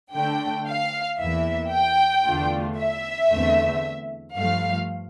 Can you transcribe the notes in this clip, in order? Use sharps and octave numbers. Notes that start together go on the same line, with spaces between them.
D3 A3 D4 G5
F5
E2 E3 A#3 E5
G5
E2 D3 A3 D4 F4
E5
E2 D3 A3 C4
G2 F3 A3 F5